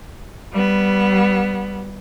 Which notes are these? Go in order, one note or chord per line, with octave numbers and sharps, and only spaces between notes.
G3 B3